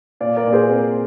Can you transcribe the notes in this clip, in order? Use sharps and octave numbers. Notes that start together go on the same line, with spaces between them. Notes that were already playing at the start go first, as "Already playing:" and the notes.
A#2 D5 F5
A#4 D5
A#2
G#4 C5
C4